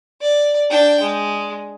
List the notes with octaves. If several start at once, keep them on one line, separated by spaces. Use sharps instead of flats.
D5
D4 G5
G#3